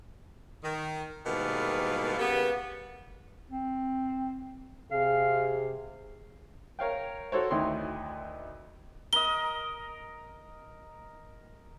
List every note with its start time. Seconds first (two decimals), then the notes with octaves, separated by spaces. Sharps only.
0.63 D#3
1.26 G#2 B2 D#3 E3 G3 A#3
2.19 C#3 G3 A#3 B3
3.50 C4
4.91 C3 G#4 F5
6.79 A#4 C#5 F5 G5
7.32 F#4 A4 C5 C#5
7.50 D2 D#3 D#4 E4 C6
9.13 A#4 D#5 G7